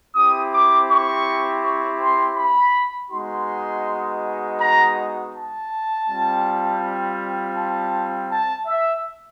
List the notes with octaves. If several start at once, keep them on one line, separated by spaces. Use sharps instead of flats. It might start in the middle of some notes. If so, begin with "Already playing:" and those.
C4 E4 G4 D#6
D6
C#6
C#6
C6
B5
G#3 B3 D#4 F#4 C6
A#5
A5
G3 C4 F4
A5
A5
E5